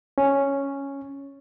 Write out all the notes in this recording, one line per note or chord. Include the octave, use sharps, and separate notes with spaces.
C#4